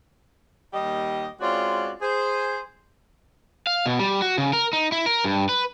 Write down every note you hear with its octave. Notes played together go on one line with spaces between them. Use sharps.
D#2 G3 G4 D#5
G#3 C4 C#4 F4 F#4 D5
G#4 C5
F5
B2
G3
F#4
C#3
A#4
D#4
E4
A#4
G2
B4